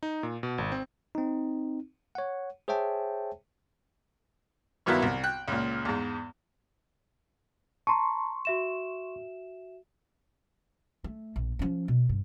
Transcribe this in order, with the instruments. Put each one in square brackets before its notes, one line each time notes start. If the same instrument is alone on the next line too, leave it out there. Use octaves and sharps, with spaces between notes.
[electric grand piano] D#4
A#2
B2
G#1
C4
[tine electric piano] C4 D#4
C#5 F#5
G#4 C5 C#5 E5 G5 A5
[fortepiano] G2 D#3 F#3 B3 E4 F4
C2
G5 F#6
C#2 A#2
E2 G#2
[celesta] A5 A#5 [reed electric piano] C6 C#6
[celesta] F#4 E5 E7
[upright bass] A3
A#1
F3 C#4
B2
G2